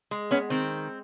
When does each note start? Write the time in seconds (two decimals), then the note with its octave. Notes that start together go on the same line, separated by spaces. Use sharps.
0.11 G#3
0.31 B3 C#4
0.50 D#3 C4